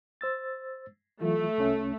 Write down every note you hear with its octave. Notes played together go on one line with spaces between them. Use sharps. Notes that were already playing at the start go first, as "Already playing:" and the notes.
C5 E6 A6
E3 F#3 A3 F4
C2 C#4 E5